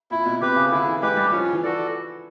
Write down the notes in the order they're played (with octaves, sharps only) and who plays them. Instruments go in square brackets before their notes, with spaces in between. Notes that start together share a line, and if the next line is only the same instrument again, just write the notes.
[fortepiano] A#2 [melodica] E4
[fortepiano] B2
[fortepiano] C3 [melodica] G4 B4
[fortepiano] C#3
[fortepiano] D3 [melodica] E4
[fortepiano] E3
[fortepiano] G#3 [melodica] G4 B4
[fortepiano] G3
[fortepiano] F3 [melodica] C#4
[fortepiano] E3
[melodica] F#4 A4 D5